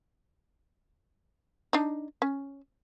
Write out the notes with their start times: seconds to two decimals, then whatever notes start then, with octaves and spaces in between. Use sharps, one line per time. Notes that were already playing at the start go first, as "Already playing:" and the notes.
1.73 D4 D#4
2.22 C#4